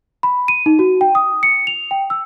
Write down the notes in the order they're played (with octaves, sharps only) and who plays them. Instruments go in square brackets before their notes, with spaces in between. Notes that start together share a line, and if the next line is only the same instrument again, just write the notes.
[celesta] B5
D#7
D#4
F#4
G5
D#6
C#7
F7
G5
E6